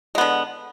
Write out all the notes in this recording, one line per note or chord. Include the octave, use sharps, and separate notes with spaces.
D3 G#3 B3